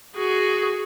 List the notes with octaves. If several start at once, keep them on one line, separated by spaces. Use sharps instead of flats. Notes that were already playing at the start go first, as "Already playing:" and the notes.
F#4 G#4